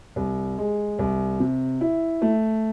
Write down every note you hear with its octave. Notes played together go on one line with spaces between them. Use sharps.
C2
G#3
C2
C3
E4
A3